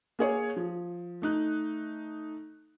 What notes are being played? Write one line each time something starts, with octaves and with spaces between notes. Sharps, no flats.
A#3 G#4 C#5
F3
A3 D#4 F#6